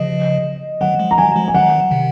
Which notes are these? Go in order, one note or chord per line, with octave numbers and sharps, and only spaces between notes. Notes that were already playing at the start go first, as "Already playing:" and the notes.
Already playing: C#3 F3 D#5
D#3 F#3 F#5
F3 G#3
A#5
D#3 F#3 G#5
F3 G#3
G#5
D#3 F#3 F#5
C3 D#3